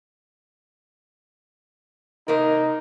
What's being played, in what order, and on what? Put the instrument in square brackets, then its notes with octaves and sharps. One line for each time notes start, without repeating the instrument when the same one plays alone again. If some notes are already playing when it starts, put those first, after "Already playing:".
[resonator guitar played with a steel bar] C3 A#3 A#4 [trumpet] D#4